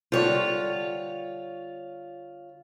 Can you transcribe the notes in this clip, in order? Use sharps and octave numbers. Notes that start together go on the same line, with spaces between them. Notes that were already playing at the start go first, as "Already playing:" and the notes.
D3 G3 F4 C5 C#5